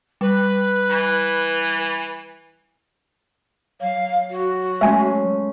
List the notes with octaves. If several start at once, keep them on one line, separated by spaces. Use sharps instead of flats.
G3 B4
E3
F#3 F5
F#4
G#3 A3 C#4 E5 G#5